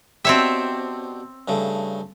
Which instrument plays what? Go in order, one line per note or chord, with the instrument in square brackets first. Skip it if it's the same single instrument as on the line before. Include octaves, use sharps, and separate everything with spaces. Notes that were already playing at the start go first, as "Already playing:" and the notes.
[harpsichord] B2 D4 G4 [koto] C4 C#5 E5
[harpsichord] G2 C#3 A3